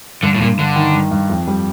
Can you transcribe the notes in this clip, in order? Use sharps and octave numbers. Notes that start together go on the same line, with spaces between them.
G2 D3
A2
G2 A#2
G2 D3
D#3
G2
G2
F2
G3